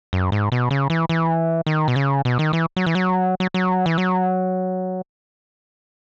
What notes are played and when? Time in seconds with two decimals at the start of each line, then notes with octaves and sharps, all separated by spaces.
0.13 F#2
0.32 G#2
0.52 B2
0.71 C#3
0.90 E3
1.09 E3
1.66 D#3
1.88 B2
1.96 C#3
2.25 B2
2.39 D#3
2.53 E3
2.76 F#3
2.86 E3
2.95 F#3
3.40 F#3
3.54 F#3
3.86 E3
3.98 F#3